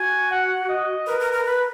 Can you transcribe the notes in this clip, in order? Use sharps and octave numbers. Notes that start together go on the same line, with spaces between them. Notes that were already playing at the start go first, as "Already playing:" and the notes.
Already playing: F#4 G#5
F#5
D#5
A#4 B4
A#4
A#4
B4